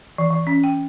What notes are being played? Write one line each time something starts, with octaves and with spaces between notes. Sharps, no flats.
E3
E3
C#4
G5